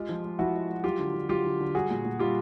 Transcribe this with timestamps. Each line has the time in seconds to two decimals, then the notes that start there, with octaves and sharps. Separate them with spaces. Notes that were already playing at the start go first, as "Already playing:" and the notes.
Already playing: G#3 F4 G4
0.09 F3
0.24 G#3
0.39 F3 E4 F#4
0.55 G#3
0.69 G#3
0.84 F#3 F4 G4
0.99 D3
1.14 D3
1.29 F#3 F4 G4
1.45 D3
1.60 D3
1.75 G3 F#4 G#4
1.90 A#2
2.05 A#2
2.19 G3 F4 G4